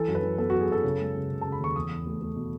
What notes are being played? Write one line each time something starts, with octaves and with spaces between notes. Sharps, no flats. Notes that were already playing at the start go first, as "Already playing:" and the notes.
Already playing: E3 A4
F#2
B4
E3
B3 A4
F#2 F#4
G#4
F#2 A4
C#3
G#3
C#3
C#3
C#3 A5
B5
D#2 C#6
E2 D#6
E2
A3
A3
B2